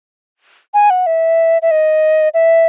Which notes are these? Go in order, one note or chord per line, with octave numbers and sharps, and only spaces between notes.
G#5
F#5
E5
E5
D#5
E5